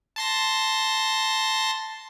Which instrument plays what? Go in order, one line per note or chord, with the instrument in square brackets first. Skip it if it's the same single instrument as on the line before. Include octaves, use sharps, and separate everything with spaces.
[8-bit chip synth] A5 C6 A#6